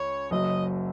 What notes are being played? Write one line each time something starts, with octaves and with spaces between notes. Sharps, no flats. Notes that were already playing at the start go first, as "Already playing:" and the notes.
Already playing: C#2 C#5
F#1 F#2 F#3 D#5